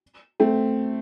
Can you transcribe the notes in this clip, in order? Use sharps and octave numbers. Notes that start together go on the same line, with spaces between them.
A3 C4